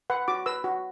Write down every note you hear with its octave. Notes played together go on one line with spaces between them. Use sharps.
B4 F#5
F#4 D6
B4 E6
F#4